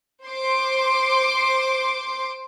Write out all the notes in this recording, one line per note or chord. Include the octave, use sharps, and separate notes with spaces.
C5 C6 D6